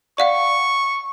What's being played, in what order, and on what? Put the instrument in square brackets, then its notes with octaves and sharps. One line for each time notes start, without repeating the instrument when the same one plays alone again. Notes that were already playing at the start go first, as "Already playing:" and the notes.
[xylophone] D5 F5 F#5 [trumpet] C#6